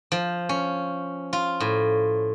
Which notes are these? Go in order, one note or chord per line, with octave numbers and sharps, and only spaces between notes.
F3
C#4
F4
A2